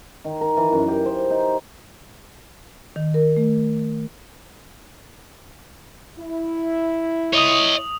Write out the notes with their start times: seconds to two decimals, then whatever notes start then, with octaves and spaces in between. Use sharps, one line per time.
0.24 D#3
0.41 A#4
0.57 E3
0.72 F#2
0.88 G4
1.05 C5
1.30 D#4
2.96 D#3
3.14 A#4
3.37 A3
6.18 E4
7.33 C#5 D#5 D#6 F7